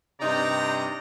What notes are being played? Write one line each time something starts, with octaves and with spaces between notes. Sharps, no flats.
G2 C3 D#4 D5 A#5